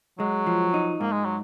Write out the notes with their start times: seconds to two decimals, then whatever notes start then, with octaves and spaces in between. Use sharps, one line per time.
0.19 F#3 G#3
0.47 F3
0.74 D#4
1.00 G#2 A#3
1.12 G#3
1.25 F#3